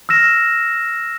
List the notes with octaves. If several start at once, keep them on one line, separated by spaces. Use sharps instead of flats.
E6 F6 A#6 E7